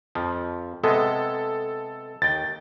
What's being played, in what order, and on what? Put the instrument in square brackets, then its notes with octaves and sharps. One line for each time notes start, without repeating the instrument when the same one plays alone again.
[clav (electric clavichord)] F2 F3
[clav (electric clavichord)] C3 G#3 B3 [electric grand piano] A4
[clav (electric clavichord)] D#2 G5 [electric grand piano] A6